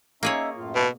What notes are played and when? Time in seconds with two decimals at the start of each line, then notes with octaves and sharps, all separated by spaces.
0.23 A#3 C#4 D#4 G#4 C#5 E5
0.56 F#2 A2 F4
0.75 B2